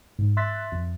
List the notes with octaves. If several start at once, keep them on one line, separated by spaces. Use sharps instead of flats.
G#2
E5 C6 E6 F#6 A6 B6
F2